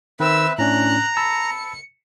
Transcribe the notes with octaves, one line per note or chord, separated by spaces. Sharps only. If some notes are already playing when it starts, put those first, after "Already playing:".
D#3 C4 B4 E5 E6
A2 C#4 D4 A#5 F#6
A5 B5 E6 C#7